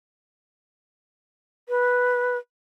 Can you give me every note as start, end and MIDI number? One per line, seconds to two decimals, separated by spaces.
1.69 2.37 71